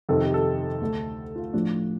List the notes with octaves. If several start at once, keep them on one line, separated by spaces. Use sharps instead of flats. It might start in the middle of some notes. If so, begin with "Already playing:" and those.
F2 C3 D#3 A4
G4
A4
D2 D3 A3
F4
A2 F3 A3 D4